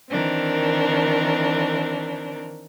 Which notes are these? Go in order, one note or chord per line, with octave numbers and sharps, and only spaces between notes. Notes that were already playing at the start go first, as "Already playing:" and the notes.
D#3 E3 C4 D4 A#4